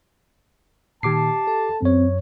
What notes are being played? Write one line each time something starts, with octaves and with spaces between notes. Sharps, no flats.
A#2 D#3 G4 A5 D6 C7
A4
F#2 C4 C#5